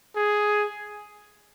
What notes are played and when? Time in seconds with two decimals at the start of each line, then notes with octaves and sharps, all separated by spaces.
0.16 G#4